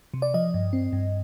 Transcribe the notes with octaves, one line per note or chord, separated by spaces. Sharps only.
C3
D5
F3 D#5
G2
C4
G2